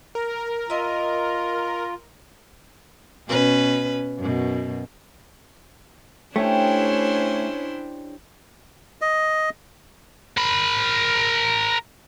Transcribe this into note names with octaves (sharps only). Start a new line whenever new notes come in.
A#4
F4 D#5 E5
B2 C#4 B4
F#2 B2
A3 C#4 D4 E4 G4 C5 C#5
D#5
A#4 B5